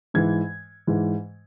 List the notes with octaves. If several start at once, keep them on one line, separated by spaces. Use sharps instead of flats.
G#2 E3 G#6
G#2 E3